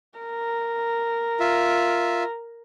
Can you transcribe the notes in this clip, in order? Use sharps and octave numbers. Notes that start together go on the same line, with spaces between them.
A#4
F4 E5